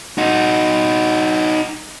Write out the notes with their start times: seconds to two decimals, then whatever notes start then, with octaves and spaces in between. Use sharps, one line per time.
0.18 D#4 F#4